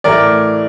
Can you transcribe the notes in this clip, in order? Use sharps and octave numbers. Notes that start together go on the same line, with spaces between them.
A2 E3 A3 A#4 D5